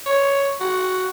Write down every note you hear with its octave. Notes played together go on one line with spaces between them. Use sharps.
C#5
F#4